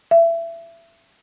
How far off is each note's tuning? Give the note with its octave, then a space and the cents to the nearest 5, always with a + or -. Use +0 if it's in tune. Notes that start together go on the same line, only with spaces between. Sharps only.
E5 +25